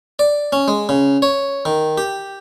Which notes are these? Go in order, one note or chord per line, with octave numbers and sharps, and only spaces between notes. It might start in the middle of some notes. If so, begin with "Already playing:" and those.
D5
C#4
G#3
C#3
C#5
D#3
G4